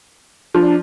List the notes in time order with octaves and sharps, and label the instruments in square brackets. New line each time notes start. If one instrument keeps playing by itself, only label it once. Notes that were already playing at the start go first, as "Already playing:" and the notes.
[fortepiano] F3 [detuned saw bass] D4